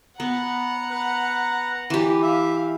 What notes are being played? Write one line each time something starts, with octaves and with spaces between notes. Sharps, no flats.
B3 F#5 A#5
B4
E3 G4
E5 F5